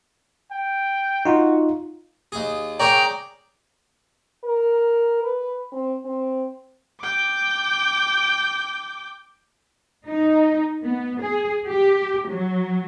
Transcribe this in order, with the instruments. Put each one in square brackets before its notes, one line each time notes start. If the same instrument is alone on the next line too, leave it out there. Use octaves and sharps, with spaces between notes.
[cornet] G5
[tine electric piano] D#4 F4 [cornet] F#4
[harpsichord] D#2 G#4
[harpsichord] G#4 A#4 C#5 [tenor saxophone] D5 [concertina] G5 A#5
[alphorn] A#4
B4
C4
C4
[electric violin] G5 D6
[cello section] D#4
B3
G#4
G4
F#3